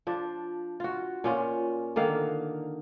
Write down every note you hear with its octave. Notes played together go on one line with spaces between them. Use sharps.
F3 D4
F4 F#4
A#2 C#4 F4
D3 D#3 A#3 F5